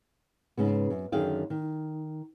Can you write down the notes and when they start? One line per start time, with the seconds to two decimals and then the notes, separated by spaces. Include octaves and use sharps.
0.57 G#2 C#3 B3
0.90 F#2
1.12 F#2 D3 D#3 G#4 F5 G5
1.50 D#3